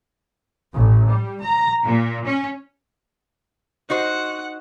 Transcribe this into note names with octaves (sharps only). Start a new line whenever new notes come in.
A1
G3
A#5
A#2
C#4
D#4 F#4 C5 F#5